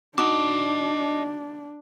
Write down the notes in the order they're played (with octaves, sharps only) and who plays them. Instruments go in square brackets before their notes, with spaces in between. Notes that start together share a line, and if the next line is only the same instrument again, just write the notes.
[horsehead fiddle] D4 [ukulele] D#4 F#4 [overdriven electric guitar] D#5 A5 [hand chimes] D6